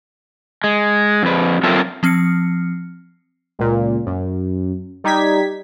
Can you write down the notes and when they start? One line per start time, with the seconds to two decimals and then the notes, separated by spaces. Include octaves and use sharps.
0.64 G#3
1.23 F2 B4
1.63 F#3 C4 F4 A4 A#4 E5
2.03 F3 C4 F6 C7 C#7
3.59 C#2 A#2
4.07 F#2
5.04 G3 D#4 G4 G#6 B6